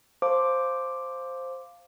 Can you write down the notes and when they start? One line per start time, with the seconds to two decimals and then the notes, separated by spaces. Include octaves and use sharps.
0.22 C5 F5 A5 D6